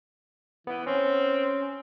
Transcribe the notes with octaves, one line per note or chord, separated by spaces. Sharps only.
E3 B3
C4 C#4